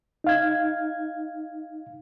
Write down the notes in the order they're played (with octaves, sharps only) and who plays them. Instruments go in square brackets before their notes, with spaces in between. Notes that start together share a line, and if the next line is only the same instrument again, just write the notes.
[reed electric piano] D#4 F5 G#6